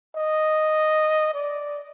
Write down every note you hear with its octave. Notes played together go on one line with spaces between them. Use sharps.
D#5
D5